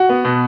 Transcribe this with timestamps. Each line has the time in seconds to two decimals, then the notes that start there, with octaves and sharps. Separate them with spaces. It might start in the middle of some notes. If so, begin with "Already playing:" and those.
Already playing: F#4
0.09 B3
0.25 B2